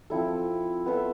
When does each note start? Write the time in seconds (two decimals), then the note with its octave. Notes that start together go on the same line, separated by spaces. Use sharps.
0.10 F3 C4 E4 A4
0.86 B3 F4 A4 E5